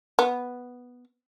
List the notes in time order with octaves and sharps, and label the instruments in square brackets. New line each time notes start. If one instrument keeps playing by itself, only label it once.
[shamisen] B3